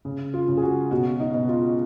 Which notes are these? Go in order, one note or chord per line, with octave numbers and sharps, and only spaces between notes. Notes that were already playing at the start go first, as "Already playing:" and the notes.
C#3
F4
C#3
G#4
F#4
B2 F#4
D#4
B2
F4